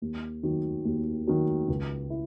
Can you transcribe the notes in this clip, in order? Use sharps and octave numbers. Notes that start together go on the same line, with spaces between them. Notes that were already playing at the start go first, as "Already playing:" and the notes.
D#2
D#3 F#3
D#2
D#3 F#3
C#2
E4